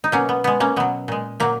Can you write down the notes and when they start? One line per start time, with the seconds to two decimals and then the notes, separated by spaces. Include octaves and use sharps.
0.04 D#4
0.12 B2 F#3 A#3 C#4
0.29 B3
0.44 B2 G#3 B3
0.60 A#3 C#4
0.76 B2 F#3 B3
1.08 A#2 G#3
1.40 A#2 F#3 A#3